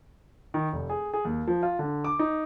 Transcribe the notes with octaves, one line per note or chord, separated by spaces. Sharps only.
D#3
F1
G#4
G#4
D#2
F3
F4
D3
D6
D#4